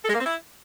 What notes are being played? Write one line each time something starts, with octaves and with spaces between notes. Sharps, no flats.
A4
G#3
A#3
C4
E4